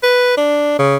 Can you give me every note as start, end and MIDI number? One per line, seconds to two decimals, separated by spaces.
0.03 0.35 71
0.37 0.78 62
0.79 0.97 49